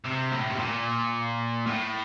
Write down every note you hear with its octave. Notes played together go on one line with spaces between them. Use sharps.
C3
A2
C3
A#2
A2